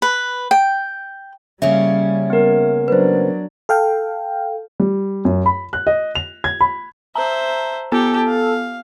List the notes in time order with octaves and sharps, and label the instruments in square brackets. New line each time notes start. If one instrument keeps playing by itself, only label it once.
[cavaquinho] B4
G5
[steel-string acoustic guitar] C#3 A#3 C#4 [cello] G3 [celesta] E5
[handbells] B3 A#4
[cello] F#3 D4 [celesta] B4 C5
[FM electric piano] A4 F5 G5
[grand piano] G3
F#2
B5
F#6
D#5
F7
G#6
B5
[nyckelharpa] C5 E5 [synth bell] A5 A#5
[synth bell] B3 [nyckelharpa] G4 [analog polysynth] A4
[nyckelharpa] F5